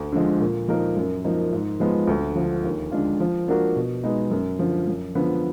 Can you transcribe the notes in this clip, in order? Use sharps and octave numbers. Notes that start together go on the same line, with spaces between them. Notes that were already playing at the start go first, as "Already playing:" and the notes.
Already playing: D2
D3 F3 G#3
A#2
F3 A#3 D#4 A#4
F#2
F3 A#3 D#4
G#2
F3 G#3 B3
D2
D3 F3
D#2
D3 G#3 D4 F4
F3
A#3 D4 F#4 A#4
B2
G#3 B3 D#4
F#2
D3 F3
F#2
D3 F3 B3